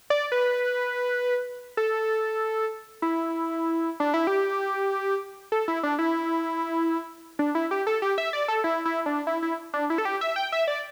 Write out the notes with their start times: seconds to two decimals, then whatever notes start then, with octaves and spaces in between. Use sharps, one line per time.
0.10 D5
0.32 B4
1.77 A4
3.02 E4
4.00 D4
4.14 E4
4.27 G4
5.52 A4
5.68 E4
5.83 D4
5.99 E4
7.39 D4
7.55 E4
7.71 G4
7.87 A4
8.02 G4
8.18 E5
8.33 D5
8.48 A4
8.64 E4
8.85 E4
9.06 D4
9.27 E4
9.42 E4
9.74 D4
9.90 E4
9.98 A4
10.05 G4
10.21 E5
10.36 G5
10.52 E5
10.68 D5